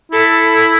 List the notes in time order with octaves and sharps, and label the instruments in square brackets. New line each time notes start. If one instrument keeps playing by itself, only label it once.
[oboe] E4 [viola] A4